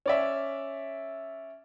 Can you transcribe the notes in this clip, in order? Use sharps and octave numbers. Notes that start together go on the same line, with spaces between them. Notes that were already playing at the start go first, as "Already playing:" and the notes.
C#4 D5 E5